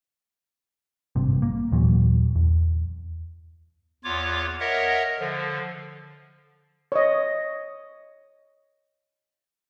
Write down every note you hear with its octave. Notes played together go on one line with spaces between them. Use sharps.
G#1 G2 C3
A#3
D#2 A#2 E3 F#3
E2
E2 F4 C#5 D6
A#4 C#5 D#5 E5 F#5
D3 F3
C#5 D#5